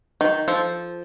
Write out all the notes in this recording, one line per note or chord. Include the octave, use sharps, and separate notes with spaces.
D#3
F3 A4